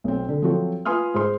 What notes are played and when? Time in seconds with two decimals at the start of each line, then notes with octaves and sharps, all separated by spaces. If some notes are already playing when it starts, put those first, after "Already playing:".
0.04 B1 C4
0.29 D3
0.42 F3 F#3 C4 F#4 A4
0.85 F4 B4 G#5 C6 D#6 F6
1.14 G#2 C5 C6